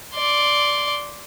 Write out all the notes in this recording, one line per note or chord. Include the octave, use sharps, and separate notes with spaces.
D5 C6